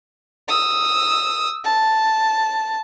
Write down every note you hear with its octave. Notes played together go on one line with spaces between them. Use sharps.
D#6 E6
A5